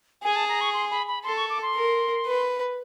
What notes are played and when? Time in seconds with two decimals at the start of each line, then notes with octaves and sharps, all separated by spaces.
0.23 G#4 G#5
0.36 A5
0.49 A#5
0.61 C#6
0.74 C6
0.91 B5
1.08 B5
1.24 A4 C6
1.37 C#6
1.49 D6
1.62 C6
1.75 A#4
2.26 B4